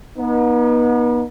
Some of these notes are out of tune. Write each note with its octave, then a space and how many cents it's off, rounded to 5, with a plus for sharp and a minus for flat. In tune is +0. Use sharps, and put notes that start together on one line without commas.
B3 -35 D#4 +0